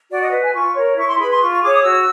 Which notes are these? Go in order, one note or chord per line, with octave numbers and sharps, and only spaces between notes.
F#4 D5
D#5
B4
G#5
F4 C#6
A#4 C#5
E4 C#6
C6
G#4 B4 B5
C6
F4 C#6
C#6
G#4 C#5 D6
D#6
F#4 E6